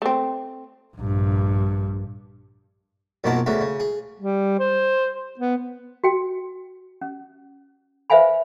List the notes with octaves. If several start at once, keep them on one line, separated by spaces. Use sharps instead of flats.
A3 C4
A#1 G2
A#1 F#2 B2 D#3 F#4 A5
D2 C#3 F#3 E5
C#3
G#4
G3
C5
B3
F#4 G5
C#4
B4 C5 E5 F5 G#5 B5